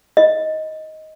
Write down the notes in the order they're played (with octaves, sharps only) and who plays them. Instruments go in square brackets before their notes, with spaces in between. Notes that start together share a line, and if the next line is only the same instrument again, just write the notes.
[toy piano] D#5